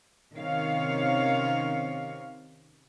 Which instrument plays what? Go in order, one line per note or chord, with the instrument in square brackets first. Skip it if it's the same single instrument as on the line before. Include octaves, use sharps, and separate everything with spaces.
[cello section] C3 D#3 C4 C#4 C#5 F5